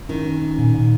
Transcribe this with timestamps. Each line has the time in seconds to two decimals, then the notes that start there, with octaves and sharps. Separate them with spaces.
0.09 D#3 C#4
0.26 C#4
0.42 C#4
0.58 A#2
0.74 A#2